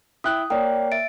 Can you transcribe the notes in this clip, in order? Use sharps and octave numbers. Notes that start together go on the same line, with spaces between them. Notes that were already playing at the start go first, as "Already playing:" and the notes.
E4 G5 D#6 F#6
A#3 C#5 D5 G5
E5 A6 D7